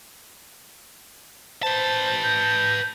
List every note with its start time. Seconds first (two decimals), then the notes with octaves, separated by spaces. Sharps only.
1.63 B4 C5 A5
2.23 G6